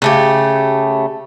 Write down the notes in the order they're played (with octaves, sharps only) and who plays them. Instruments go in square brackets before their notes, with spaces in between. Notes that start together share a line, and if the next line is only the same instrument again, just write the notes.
[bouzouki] C#3 A3 G4